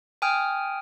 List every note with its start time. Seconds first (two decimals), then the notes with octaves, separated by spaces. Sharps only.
0.22 G5 G#5 D#6 F6